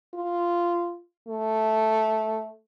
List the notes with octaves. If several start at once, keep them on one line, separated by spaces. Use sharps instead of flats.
F4
A3